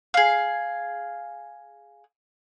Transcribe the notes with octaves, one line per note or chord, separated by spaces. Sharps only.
G#4 F5